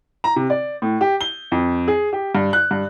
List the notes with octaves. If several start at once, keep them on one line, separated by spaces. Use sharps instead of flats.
A#5
C3
D5
A2
G4
G7
F2
G#4
G4
G2
F#6
G2